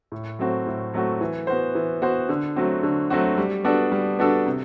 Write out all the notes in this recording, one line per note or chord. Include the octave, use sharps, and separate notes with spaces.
A2
F#3 A3 C4 F#4
A2
F#3 A3 C4 F#4
E3
B3 F#4 C5
E3
B3 F#4 C5
D3
F#3 A3 C4 F#4
D3
F#3 A3 C4 F#4
G3
B3 D4 F#4 A4
G3
B3 D4 F#4 A4
C3